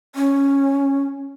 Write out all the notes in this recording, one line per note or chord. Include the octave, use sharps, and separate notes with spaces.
C#4